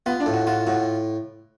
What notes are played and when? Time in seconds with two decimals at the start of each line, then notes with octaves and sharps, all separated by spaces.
0.06 B3 F4
0.20 D4
0.26 A2
0.33 F#4
0.47 F4 F#4
0.67 A2 F#4